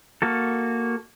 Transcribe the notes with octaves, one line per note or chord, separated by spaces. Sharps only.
A#3 F#4 A4